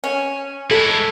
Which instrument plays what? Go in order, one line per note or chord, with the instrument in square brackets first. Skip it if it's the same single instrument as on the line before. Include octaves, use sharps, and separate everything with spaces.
[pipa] C#4
[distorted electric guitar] G#3 E4 [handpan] A4